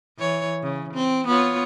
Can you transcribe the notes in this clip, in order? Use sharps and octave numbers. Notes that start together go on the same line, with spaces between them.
E3 C#5
C#3
C4
B3 F4 C#5